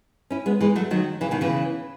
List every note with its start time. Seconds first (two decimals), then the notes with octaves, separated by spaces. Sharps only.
0.30 C#4 E4
0.46 G#3 B3
0.60 E3 G#3
0.75 F#3 A3
0.91 D#3 F#3
1.21 C#3 E3
1.31 B2 D#3
1.41 C#3 E3